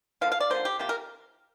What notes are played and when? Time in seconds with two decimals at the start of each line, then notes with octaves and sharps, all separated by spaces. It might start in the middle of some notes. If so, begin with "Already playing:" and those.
0.21 D3 F3 A#3 F5
0.32 F5
0.40 D5
0.50 D3 F3 A#3 C5
0.65 G4
0.79 C3 F3 A#3 G4
0.89 A#4